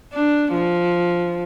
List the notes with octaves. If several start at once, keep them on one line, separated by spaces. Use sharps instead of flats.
D4
F3